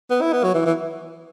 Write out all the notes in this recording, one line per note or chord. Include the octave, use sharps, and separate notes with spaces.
B3
E4
B3
F#3
E3
E3